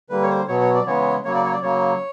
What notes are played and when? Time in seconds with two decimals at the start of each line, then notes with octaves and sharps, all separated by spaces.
0.09 D3 G3 A#3 B4
0.22 C#5
0.29 C5
0.48 B2 F#3 B3 C#5
0.61 C#5
0.74 D5
0.86 C#3 E3 G#3 B3 C#5
1.24 C#3 F#3 A#3 C#5
1.34 D5
1.44 C#5
1.52 D5
1.62 C#3 F#3 A#3 C#5